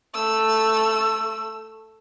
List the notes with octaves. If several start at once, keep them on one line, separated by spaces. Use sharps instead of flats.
A3 E6